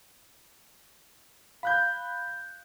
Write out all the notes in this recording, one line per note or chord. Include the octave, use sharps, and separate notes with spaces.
F5 B5 F#6 G6